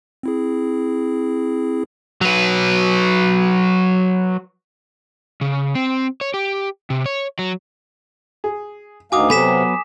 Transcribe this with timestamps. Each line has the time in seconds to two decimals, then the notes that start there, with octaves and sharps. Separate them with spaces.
0.23 C4 E4 G#4
2.21 F#3 B4
5.41 C#3
5.75 C4
6.21 C#5
6.34 G4
6.90 C3
7.06 C#5
7.39 F#3
8.44 G#4
9.12 D2 D#3 F#4 F5 G#5 D6 D#6
9.30 C3 F#3 B3 A4 G#5 B6 E7